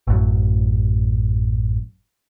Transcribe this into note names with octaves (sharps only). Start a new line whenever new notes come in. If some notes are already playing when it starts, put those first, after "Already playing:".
A1 F#2